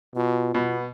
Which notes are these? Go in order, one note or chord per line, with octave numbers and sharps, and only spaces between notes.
B2 F4
B2 B3